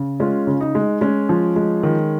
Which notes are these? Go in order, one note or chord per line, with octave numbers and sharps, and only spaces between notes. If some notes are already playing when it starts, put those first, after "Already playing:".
Already playing: C#3
G#3 C#4 F4
C#3
D#4
G#3
G#3 C#4
F3
G#3
D#3